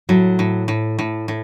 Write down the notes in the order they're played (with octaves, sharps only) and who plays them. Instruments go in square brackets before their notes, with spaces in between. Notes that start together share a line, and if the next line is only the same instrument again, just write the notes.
[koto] A2 [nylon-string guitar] F#3
[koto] A2
A2
A2
A2